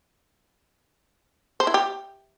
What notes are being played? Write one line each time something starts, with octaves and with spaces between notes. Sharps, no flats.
C5
E4
G4